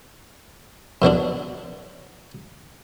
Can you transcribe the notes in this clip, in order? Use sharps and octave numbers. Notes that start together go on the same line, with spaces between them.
F#2 B2 F#3 D4